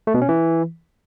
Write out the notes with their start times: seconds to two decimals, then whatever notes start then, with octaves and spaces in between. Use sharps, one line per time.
0.07 A3
0.14 B2
0.22 C#4
0.29 E3